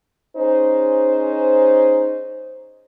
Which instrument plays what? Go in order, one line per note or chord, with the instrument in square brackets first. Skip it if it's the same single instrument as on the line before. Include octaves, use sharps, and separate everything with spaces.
[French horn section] C#4 D#4 G#4 C5